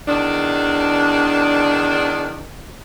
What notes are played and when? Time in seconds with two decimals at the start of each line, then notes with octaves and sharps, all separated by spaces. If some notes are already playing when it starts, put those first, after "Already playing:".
0.08 E2 D#3 D4